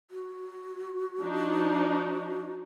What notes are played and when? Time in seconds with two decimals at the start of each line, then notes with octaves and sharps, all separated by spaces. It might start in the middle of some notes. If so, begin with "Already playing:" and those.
0.11 F#4
1.19 F3 D4 D#4